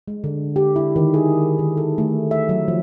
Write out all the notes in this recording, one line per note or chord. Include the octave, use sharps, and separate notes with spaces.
G#3
D3
G4
E4
D#3
G#4
D#3
A4
A3
E5
F#3
F3